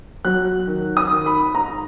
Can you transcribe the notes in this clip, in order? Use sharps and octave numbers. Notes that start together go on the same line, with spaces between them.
F#3 F#6
D#3
D#6
D#3
B5
G#2 A#5